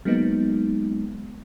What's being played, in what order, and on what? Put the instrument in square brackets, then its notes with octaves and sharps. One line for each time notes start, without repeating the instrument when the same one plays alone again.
[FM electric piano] F#3 G#3 A#3 B3 D#4